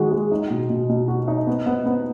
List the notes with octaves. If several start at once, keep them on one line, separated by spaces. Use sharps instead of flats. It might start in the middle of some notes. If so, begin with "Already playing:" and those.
Already playing: D#3 G#3 F#4
G#3
D#4
B2
B2
B2
F#4
D#4
B3
B3
B3